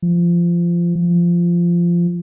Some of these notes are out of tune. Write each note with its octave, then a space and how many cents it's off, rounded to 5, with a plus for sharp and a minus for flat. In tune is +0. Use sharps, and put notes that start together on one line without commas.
F3 -20
F3 -15